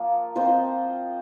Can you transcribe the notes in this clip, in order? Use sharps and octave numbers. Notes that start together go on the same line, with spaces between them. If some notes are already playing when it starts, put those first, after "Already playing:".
Already playing: F3 A#3 F4
C4 F4 C5 D#5